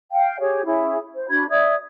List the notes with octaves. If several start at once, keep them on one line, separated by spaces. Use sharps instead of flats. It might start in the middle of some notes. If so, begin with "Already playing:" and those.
F5 G5
G4 G#4 C#5
C#4 E4 G#4
C5
D4 F#4 B5 G#6
D5 E5 D#6 G#6